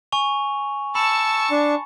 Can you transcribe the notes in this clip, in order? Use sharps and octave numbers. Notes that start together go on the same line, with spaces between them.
G#5 C#6 F7
A5 B5 C#6 E6
D4